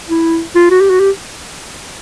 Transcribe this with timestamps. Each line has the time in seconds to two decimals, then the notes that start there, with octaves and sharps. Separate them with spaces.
0.09 E4
0.55 F4
0.71 F#4
0.81 G4
0.90 F#4
1.00 G4